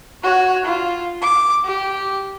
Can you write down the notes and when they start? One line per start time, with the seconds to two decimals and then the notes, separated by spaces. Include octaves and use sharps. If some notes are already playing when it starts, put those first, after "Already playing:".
0.24 F#4 C#5
0.65 F4
1.22 D6
1.65 G4